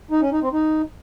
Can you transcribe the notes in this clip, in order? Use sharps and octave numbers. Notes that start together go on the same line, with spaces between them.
D#4
C#4
D#4
C4
D#4